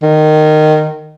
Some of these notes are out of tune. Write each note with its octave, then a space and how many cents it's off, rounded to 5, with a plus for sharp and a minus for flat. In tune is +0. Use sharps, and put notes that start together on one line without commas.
D#3 -15